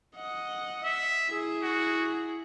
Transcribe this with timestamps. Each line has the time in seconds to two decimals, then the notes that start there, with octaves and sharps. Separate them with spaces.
0.16 D#5 F#5
0.83 E5
1.28 E4 G#4
1.62 F#4